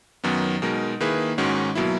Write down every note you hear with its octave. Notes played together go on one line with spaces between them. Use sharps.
F#2 D#3 F#3 B3
B2 G#3 D#4 A#4
D#3 A#3 E4 G#4 B4
G#2 D#3 G#3 C#4 F#4
B2 F#3 A#3 E4